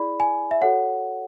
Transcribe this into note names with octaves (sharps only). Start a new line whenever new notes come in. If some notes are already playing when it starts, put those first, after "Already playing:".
Already playing: E4 G#4 D5 B5
G#5
E5
F#4 A4 C#5 F#5